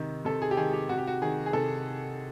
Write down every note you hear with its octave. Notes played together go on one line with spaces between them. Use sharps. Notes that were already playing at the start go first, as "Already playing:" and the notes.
Already playing: C3 D#3
C3 A4
G#4
G4
D#3 G#4
G4
C3 F#4
G4
F#4
D#3 G#4
G#4
C3 A4